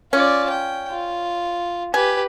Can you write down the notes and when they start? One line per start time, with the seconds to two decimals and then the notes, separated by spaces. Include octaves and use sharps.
0.13 C#4 F4 D5
0.50 G5
0.91 F4
1.94 G4 B4 G#5